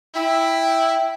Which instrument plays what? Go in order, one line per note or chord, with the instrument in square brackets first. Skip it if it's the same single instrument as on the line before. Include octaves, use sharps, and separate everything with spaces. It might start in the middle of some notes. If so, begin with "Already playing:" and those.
[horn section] E4 [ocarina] G5